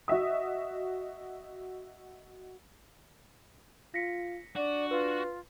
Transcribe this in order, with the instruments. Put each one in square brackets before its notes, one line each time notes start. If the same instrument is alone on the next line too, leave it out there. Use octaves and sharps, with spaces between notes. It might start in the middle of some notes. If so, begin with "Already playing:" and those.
[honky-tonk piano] F#4 D#5 E5 D#6
[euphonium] F4 [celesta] A#6 B6 C#7
[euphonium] D4 [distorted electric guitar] F#4 [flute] D5
[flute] F4 [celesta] B4